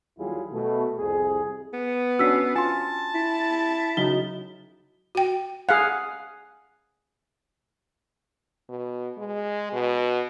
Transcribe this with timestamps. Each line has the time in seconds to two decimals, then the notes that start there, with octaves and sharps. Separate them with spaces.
0.18 D#2 F#3 G3 E4 F4 G#4
0.51 B2 A3
0.97 C2 F2 G#4
1.73 B3
2.19 C#4 D4 F#4 E6 B6 C7
2.56 F4 G#5 A5 C6
3.15 E4
3.97 C#3 F#3 D#4 F#4 G7
5.15 F#4 G5
5.69 G#4 F5 F#5
8.69 B2
9.18 G#3
9.72 B2